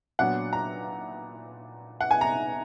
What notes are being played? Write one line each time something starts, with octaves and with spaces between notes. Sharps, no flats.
A#2 F#3 B3 D4 F#5
A#5
F#5
G#5
A#5